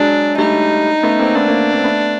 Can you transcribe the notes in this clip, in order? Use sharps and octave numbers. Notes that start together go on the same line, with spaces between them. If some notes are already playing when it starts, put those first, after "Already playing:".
Already playing: F#3 G#3 D4
G3 A3 D#4
A3 B3
A#3 C4
A3 B3 D4
A#3 C4
A#3 C4
A3 B3